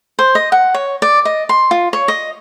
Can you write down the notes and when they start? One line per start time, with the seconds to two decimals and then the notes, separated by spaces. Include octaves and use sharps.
0.19 C5
0.35 D#5
0.52 F#5
0.75 C#5
1.02 D5
1.25 D#5
1.49 C6
1.71 F4
1.93 C#5
2.08 D#5